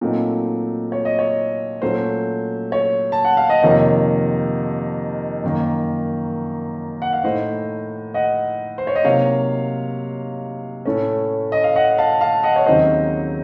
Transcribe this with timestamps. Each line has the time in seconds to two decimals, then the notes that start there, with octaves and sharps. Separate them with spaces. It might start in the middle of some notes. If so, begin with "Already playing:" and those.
0.01 A#2 F#3 A3 C4 D#4
0.92 C#5
1.05 D#5
1.19 C#5
1.82 A#2 F#3 A3 C#4 C5
2.72 C#5
3.12 A5
3.25 F#5
3.37 F5
3.50 D#5
3.62 F2 C3 D#3 A#3 D#4 C#5
5.43 F#2 D#3 A#3
7.02 F#5
7.13 F5
7.24 A2 A3 D#4 C5 D#5
8.14 D#5 F#5
8.78 C5
8.87 C#5
8.96 D#5
9.04 C3 F#3 A#3 D#4 C#5 F5
10.86 A2 A3 C#4
11.52 D#5
11.64 F5
11.76 D#5 F#5
11.98 F5 A5
12.21 F5 A5
12.43 D#5 F#5
12.56 C#5
12.66 D#2 C#3 F#3 C4 D#4 C5 D#5